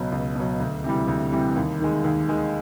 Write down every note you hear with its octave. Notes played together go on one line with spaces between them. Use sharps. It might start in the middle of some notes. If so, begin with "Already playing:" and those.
Already playing: C#2 B2 F#3
C#2
B2 F#3
D2
C3 E3 G3
D2
C3 E3 G3
D#2
D#3 G#3
D#2
D#3 G#3